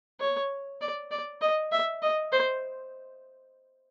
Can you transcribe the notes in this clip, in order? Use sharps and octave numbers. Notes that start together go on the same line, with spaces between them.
C#5
D5
D5
D#5
E5
D#5
C5